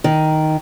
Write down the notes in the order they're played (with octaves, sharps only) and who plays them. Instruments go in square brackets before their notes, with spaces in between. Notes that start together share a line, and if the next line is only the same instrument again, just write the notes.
[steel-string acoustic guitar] D#3